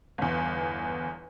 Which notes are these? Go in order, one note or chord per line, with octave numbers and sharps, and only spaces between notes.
G1 E2